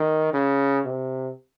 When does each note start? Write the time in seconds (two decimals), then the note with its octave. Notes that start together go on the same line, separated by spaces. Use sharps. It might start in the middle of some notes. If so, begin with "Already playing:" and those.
Already playing: D#3
0.34 C#3
0.85 C3